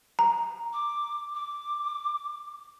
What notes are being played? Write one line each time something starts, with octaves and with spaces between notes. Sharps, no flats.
A#5
D6
D6